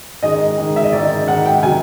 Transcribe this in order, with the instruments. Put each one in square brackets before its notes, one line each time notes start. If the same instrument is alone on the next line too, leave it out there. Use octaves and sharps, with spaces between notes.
[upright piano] G#2 D#3 G#3 D#5
G#2 D#3 G#3
E5
D#5
G#2 D#3 G#3 D5
G#2 D#3 G#3 F#5
G5
C3 D#3 F#3 G#5